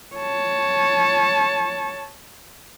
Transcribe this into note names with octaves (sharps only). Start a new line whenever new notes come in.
C#5 A5